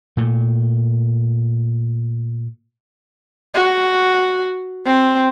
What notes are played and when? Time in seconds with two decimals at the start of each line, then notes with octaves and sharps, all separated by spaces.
0.17 A#2 A3
3.55 F#4
4.86 C4